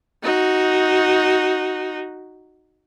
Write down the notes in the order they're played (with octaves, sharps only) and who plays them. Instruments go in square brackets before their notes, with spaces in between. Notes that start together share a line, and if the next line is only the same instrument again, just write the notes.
[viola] D#4 F#4